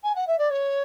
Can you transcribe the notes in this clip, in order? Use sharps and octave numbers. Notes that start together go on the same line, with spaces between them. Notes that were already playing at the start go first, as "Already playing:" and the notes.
G#5
F#5
E5
D5
C#5